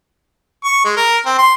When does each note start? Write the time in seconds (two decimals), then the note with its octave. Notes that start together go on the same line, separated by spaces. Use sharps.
0.64 C#6
0.85 G#3
0.96 A#4
1.26 C4
1.38 C6